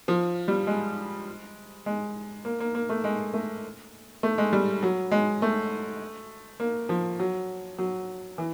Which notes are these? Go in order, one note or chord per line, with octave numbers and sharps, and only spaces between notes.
F3
G3
G#3
G#3
A#3
A#3
A#3
A3
G#3
A3
A3
G#3
G3
F#3
G#3
A3
A#3
F3
F#3
F#3
E3